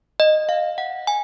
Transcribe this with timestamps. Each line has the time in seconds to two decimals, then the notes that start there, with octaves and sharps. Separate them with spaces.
0.20 D#5
0.49 F5
0.78 F#5
1.07 G#5